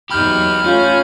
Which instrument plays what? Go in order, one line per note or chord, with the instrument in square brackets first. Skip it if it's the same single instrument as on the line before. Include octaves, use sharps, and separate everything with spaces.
[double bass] E2 F#3 [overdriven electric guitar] D#4 G4 [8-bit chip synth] B5 F6 G6
[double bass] A3 [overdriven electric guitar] C#4 [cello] F4